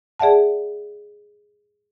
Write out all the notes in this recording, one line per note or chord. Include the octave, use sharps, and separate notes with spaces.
G#4 D5 E5 F#5 A5